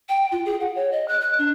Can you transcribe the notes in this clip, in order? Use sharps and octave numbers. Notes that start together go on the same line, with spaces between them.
G5
F4
G#4
F#5
C#5
D#5
F#6
F#6
D4